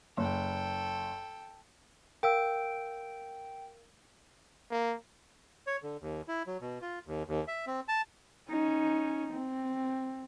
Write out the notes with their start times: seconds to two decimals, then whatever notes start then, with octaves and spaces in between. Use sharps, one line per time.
0.17 F#1 A4 G5
2.23 A#4 F5 G5 E6 D7
4.71 A#3
5.67 C#5
5.83 D3
6.01 D#2
6.28 E4
6.47 F#3
6.61 B2
6.82 F4
7.07 D#2
7.28 D#2
7.48 E5
7.67 C4
7.88 A5
8.50 C#4 D#4
9.33 C4